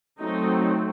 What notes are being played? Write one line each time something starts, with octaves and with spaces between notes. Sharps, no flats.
F#3 A3 C4 D#4